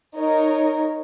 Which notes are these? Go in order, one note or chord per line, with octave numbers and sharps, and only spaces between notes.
D#4 A#4 C#5